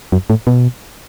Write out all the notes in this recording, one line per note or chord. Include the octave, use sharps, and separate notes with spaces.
F#2
A2
B2